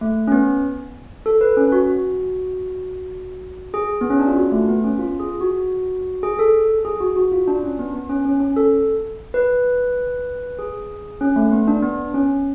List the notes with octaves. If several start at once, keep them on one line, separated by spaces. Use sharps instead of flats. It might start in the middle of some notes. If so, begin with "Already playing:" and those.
A3
C#4
B3
A4
B4
C#4
F#4
F#4
G#4
B3
C#4
D4
F4
F#4
A3
B3
C#4
F4
G#4
F#4
G#4
A4
G#4
F#4
F#4
F4
D4
C#4
B3
B3
C#4
C#4
C#4
A4
B4
G#4
C#4
A3
B3
D4
B3
C#4